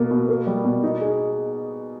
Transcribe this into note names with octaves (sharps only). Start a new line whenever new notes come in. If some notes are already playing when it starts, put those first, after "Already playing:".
Already playing: B2 A#3
B2
A#3
G3
B2
D#4
G#4